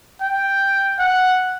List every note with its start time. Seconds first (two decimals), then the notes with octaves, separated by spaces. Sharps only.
0.21 G5
0.99 F#5